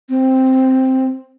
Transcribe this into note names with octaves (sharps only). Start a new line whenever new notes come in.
C4